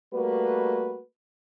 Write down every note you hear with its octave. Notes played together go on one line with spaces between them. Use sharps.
G3 A3 A#3 F#4 B4